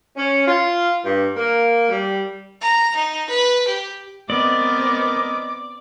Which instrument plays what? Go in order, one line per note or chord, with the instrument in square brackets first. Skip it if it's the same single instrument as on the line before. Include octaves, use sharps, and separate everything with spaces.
[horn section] C#4
F4
G2
A#3
G3
[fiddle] A#5
D#4
B4
G4
[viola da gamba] B3 C4 [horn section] A#4 D#5 [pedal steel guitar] D5 [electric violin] D6